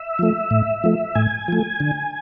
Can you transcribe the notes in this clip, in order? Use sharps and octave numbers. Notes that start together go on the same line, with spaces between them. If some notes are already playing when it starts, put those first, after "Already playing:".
Already playing: E5
F3 A3
A2
F3 A3
A2 G#5
F3 A3
D3